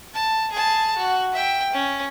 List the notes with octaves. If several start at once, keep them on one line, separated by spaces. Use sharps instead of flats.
A5
G#4 A5
F#4
E5 G5
C#4